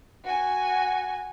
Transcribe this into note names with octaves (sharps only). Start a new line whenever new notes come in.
F#4 G#5